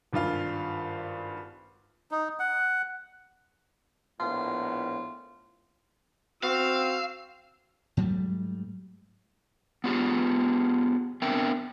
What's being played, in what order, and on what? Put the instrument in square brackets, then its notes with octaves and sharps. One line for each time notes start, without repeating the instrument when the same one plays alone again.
[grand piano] G#1 G2 F4 F5
[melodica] D#4
F#5
[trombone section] A#1 A2 B3 [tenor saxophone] F4
[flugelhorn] C4 [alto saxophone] F#4 [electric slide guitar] F5 [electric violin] E6
[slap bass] G#2 F#3 G3 A3
[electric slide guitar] B3 F4 G4 G#4
B3 C4 D4 A#4 E5 G5